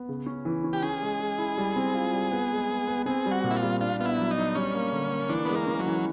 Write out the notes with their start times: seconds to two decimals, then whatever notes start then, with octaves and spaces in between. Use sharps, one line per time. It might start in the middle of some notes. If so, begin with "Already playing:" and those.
Already playing: B3
0.09 C#3
0.26 C#4
0.45 E3
0.64 C#4
0.73 G4
0.82 C#4 G#4
1.02 G#3
1.20 G#3
1.38 E4
1.58 G3
1.76 C4
1.95 F4
2.13 G3
2.32 B3
2.51 G#3
2.70 B3
2.87 B3
3.06 C4 G#4
3.26 G3
3.31 F#4
3.44 A#2
3.51 E4
3.56 F4
3.63 G3
3.81 D4 F4
4.00 B3 F4
4.05 E4
4.19 F#3
4.31 D#4
4.37 D4
4.55 G3 C#4
4.74 A#3
4.93 D3
5.11 A#3
5.30 E3 D4
5.45 G#3 B3
5.55 A#3
5.67 C#4
5.80 F#3
5.86 E3